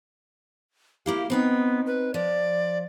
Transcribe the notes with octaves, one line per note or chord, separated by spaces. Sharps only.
A#3 E4 G4 F5
B3 C4 D#4 G5
B4
F3 D5